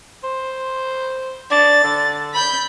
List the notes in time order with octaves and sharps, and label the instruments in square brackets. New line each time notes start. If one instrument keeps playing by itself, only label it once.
[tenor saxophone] C5
[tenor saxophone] D4 [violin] A6
[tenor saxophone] D3
[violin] B5 G6